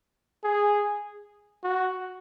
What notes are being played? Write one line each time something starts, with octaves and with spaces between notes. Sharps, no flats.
G#4
F#4